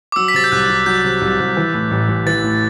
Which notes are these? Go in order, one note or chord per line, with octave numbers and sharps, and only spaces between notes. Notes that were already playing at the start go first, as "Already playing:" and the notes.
D6
F#3 E6
B6
C3 A6
G6
C2 F#6
C2
F#3 G6
C3
C2
C2
E3
A2
A1
A1
E3 A6
A2